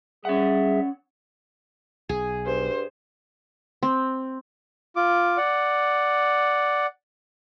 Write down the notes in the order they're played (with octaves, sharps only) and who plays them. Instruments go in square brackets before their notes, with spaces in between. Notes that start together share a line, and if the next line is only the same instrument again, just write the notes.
[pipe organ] G3 G#4 E5 [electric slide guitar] C#4 F#5
[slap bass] B1 [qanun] G#4
[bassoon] G2 [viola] C5
[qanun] C4
[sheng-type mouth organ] F4 D6
D5 F#5